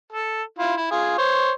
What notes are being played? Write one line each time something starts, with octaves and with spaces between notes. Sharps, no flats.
A4
E4 F4
E4
F4 G#4
C5 C#5